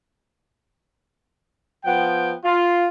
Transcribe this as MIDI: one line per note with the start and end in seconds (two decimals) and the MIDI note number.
1.85 2.32 53
1.85 2.32 59
1.85 2.32 79
2.44 2.88 65